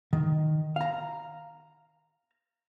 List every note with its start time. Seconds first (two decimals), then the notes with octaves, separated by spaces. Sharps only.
0.13 D#3
0.76 F5 A#5